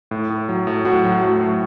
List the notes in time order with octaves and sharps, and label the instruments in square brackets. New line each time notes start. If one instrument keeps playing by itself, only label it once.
[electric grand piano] A2
A2
F#3
A2
[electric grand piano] A2 [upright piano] F#4
[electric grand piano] F#3
[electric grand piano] A3 [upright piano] F#4
[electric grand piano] A2